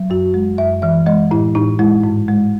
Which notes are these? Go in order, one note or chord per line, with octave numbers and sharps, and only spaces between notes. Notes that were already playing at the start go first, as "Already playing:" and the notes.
Already playing: F#3
F#2 F#4
G#3
F#2 E5
E3 E5
G#3 D#5
A2 E4
A2 D#4
G#3 E4
G#2
G#3